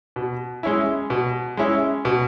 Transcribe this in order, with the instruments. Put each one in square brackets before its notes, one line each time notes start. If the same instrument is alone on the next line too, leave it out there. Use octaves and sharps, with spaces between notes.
[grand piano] B2
G#3 C#4 E4
B2
G#3 C#4 E4
B2